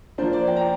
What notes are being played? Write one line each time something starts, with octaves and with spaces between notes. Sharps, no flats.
F3 A#3 D4 C5
D5
G5
A#5